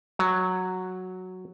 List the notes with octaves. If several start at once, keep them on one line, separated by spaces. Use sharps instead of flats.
F#3